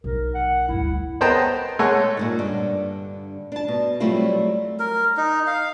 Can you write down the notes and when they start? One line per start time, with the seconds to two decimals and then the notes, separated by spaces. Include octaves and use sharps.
0.04 B1 A#4
0.35 F#5
0.68 D2 G2 E4
1.21 B3 C5 D#5 G5 A5 A#5
1.79 G#3 A3 A4 C#5 F#5 G#5
2.17 A#2 G#3 D#4
2.39 G2 D3 D4
3.52 D4 A5
3.68 B2
4.00 F#3 G3 A3 C4 E4 F4
4.80 A#4
5.17 D#4
5.47 F5